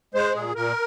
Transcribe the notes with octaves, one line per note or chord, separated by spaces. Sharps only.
G#3 C5
A#2 G#4
A#2 A#4